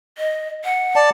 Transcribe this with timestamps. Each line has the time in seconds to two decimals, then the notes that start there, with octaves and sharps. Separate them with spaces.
0.18 D#5
0.65 F#5
0.96 D5 A5